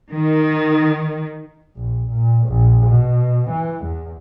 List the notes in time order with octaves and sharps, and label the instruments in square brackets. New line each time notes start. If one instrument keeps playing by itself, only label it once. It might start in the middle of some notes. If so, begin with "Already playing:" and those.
[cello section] D#3
[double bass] A#1
A#2
A#1
B2
E3
E2